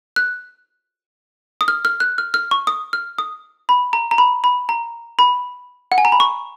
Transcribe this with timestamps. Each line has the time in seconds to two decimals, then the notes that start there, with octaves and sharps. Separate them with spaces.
0.16 F#6
1.61 D#6
1.68 F6
1.85 F6
2.00 F#6
2.18 F6
2.34 F6
2.51 C#6
2.67 D#6
2.93 F6
3.18 D#6
3.69 B5
3.93 A#5
4.11 A#5
4.18 B5
4.44 B5
4.69 A#5
5.19 B5
5.92 F#5
5.98 G#5
6.05 A#5
6.12 B5
6.20 C#6